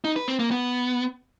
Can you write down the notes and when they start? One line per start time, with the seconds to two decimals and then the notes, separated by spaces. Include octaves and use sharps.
0.05 D#4
0.16 B4
0.28 C4
0.39 A#3
0.51 B3